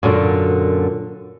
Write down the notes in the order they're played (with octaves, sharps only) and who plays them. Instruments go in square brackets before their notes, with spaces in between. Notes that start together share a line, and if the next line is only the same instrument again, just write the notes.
[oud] F#2 A#2 D3